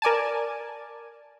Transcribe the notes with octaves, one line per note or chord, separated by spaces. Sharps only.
A#4 D5 G#5 A5